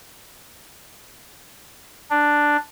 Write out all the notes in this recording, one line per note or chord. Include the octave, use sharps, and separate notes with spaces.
D4